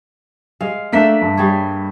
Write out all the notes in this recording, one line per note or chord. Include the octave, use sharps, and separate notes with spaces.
G#3 F5
A3 A#3 D4 E5 B6
G2
G3 G#4 C#5